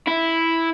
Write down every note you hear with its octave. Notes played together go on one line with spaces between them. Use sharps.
E4